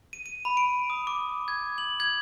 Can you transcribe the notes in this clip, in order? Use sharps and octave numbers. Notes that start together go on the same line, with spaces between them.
D#7
D#7
B5
D7
D#6
D6
G#6
F#7
G#6